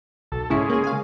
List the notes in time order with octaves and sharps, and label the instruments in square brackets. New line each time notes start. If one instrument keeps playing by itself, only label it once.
[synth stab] B1 [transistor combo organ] A4
[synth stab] G#2 C#4 E4 [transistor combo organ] C#3 G#3
[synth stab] A#3 G#4
F5 G#5